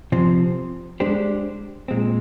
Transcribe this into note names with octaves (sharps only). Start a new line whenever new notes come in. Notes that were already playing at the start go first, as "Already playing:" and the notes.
C3 F3 C4
G#3 D4 G4 C5
A#2 G#3 C4